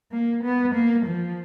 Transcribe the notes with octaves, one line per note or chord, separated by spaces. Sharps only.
A#3
B3
A#3
F3